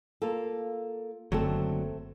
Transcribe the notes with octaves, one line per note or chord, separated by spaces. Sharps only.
A#3 F4 A4
F#1 D3 F#3 A3 C4 A4